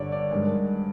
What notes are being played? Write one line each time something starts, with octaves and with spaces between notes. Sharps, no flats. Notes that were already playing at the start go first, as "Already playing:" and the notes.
Already playing: G2 D3 G3 C#5 D5
D5
G2 D#3 G#3